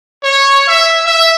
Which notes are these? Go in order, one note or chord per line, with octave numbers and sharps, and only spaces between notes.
C#5
E5
E5